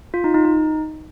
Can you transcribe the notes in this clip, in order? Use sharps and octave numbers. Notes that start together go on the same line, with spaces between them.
F4
D#4
D#4
D#4